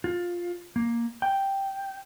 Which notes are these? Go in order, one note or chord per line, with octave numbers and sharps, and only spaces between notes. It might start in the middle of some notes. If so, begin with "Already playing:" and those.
F4
A#3
G5